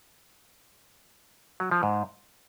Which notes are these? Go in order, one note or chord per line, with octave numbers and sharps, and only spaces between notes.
F#3
F3
G#2